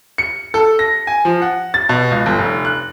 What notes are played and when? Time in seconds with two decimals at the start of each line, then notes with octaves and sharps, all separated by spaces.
0.18 C#7
0.54 A4
0.79 A#6
1.07 G#5
1.25 F3
1.42 F#5
1.74 A6
1.89 B2
2.11 C#2
2.26 G1
2.39 F1
2.65 F#6